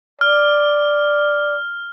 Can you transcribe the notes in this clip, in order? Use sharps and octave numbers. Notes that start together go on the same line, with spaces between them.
D5 F6